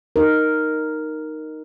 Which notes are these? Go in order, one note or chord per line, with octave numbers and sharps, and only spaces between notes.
D#4 A#4